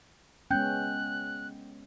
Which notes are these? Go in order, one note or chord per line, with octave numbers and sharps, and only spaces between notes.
G#3 B3 C#4 G5 F#6 G6